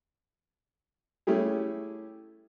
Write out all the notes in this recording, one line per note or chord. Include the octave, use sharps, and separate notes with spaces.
A3 C#4 E4 G4 G#4